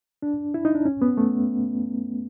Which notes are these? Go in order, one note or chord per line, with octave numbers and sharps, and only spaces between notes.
D4
E4
D#4
D4
C#4
B3
A3